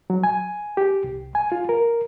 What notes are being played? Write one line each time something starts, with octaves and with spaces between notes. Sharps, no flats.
F#3
G#5
G4
C2
G#5
F4
A#4